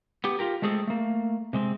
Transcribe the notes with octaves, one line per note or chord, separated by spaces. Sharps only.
B3 G4
F4 G4 A#4
G#3 A3 C4 G#4 A4
A3 A#3
C3 G#3 C4